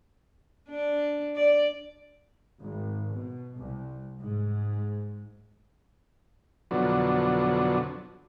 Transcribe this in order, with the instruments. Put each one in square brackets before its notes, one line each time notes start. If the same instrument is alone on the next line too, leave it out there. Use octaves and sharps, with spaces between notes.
[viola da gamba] D4
D5
[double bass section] G#1
B2
C2
G#2
[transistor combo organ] F2 B2 D3 F#3